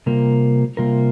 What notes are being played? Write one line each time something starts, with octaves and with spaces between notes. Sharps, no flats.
C3 G3 A#3 F4 A#4
C3 G3 A#3 F4 A#4